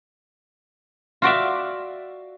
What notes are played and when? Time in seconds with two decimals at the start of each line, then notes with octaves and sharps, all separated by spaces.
1.22 F4 F#4 D5 E5